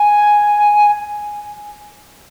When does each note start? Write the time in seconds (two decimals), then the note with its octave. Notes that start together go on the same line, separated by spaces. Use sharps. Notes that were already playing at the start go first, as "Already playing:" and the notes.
Already playing: G#5